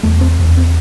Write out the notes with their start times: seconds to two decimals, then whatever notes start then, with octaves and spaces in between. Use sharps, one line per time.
0.03 E2 A3
0.21 C4
0.39 E2
0.57 C4